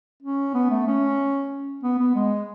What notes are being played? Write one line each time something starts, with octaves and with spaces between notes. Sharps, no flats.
C#4
B3
A3
C#4
B3
B3
G#3